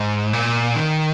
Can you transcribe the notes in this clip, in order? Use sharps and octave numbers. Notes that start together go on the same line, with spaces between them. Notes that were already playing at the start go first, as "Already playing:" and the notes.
Already playing: G#2
A#2
D#3